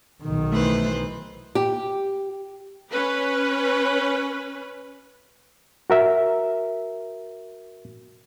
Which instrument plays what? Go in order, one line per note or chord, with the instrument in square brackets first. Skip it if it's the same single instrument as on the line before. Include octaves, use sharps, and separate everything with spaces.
[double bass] B1 D#3
[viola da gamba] E3 B4 C5 [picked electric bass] A3
[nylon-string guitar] G4
[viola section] C#4 B4
[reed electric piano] F#4 A#4 E5